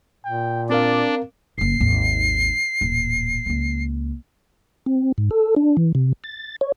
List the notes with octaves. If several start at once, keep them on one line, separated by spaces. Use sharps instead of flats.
A#2 G5
C4 D4 A#4 D5 F5
F#1 F#2 C7
G#1 D#2
D#1 A1
C#2 A#3
C4
G#2
A4
D4
E3
C3
A6
C#5